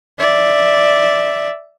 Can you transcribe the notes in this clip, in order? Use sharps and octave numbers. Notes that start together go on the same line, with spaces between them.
D5 E5